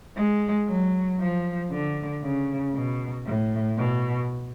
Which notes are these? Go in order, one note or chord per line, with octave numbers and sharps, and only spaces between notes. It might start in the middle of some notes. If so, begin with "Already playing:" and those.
G#3
F#3
F3
D3
C#3
B2
A2
B2